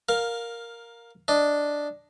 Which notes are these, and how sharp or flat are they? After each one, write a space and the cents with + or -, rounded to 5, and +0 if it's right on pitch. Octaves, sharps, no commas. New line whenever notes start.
A#4 +0 F5 +15
D4 +0 D#5 +0